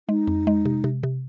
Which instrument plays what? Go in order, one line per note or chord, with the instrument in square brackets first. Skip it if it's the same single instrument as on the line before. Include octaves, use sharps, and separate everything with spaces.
[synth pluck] G#3 [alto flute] D#4
[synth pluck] F2
G#3
C3
C3
C3